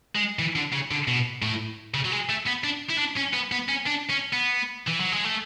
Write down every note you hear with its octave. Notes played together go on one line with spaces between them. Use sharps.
G#3
E3
D3
C#3
D3
B2
A2
C#3
F#3
G#3
A3
B3
D4
E4
D4
C#4
B3
B3
C#4
D4
C#4
B3
E3
F#3
G#3
A3